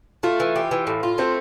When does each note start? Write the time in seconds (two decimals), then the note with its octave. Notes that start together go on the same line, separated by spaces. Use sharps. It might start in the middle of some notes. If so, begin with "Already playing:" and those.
0.23 A3 F4
0.40 E3
0.56 G4
0.71 E3
0.87 A2
1.03 F4
1.18 A3 C4